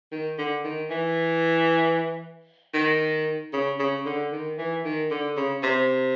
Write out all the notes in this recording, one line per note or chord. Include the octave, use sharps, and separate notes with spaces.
D#3
D3
D#3
E3
D#3
C#3
C#3
D3
D#3
E3
D#3
D3
C#3
C3